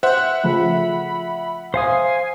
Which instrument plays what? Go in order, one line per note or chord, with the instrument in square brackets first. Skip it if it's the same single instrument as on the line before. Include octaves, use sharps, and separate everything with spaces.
[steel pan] C5 [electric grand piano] E5 F#5 [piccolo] F#6
[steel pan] C#3 F3 A3 [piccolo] B5
[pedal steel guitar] C5 F5 D#6 [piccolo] G#5